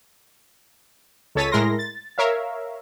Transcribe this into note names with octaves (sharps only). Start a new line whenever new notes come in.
C#2 A4 C#5 A6 B6 D#7
A2 G#3 E4 A#4 C6 A#6
A6
A#4 C#5 E5 F5